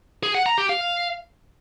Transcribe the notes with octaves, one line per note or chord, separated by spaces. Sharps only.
G#4
F#5
A#5
G4
F5